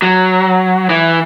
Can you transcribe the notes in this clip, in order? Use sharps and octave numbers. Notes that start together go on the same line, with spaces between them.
F#3
E3